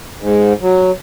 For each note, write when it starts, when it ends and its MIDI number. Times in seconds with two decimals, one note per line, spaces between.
0.21 0.53 44
0.61 0.91 54